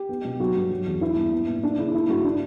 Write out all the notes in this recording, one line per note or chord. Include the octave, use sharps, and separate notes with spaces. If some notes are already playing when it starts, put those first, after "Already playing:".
Already playing: G4
B3
B2
F#3 F#4
G2
F#3
E2
B3 E4
G2
B3
A#2
A#3 D4
C#3 E4
A#3 E4
G2 F#4
A#3 D4